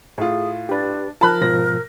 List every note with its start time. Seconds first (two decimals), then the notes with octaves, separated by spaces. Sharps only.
0.18 A2 F4 G#4
0.69 D4 G4 B4
1.21 F3 F4 A#4 A5 B5 F#6
1.42 G#2 B2 F3 A#6